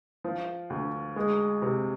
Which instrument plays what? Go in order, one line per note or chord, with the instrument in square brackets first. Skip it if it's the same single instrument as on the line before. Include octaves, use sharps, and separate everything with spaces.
[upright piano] F3
D2
G#3
C3